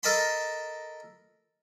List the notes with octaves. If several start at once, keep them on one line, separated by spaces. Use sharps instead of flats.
A4 A#4 D#5 A5 B5 C6